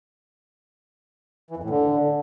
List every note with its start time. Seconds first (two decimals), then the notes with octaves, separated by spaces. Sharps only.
1.50 E3
1.57 F2
1.63 A2
1.70 D3